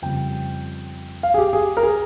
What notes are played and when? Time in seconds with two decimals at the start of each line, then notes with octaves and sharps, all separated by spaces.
0.02 F2 C#3 G3 G5
1.23 F5
1.34 G#4
1.38 G4
1.53 G#4
1.77 A#4
1.83 G#4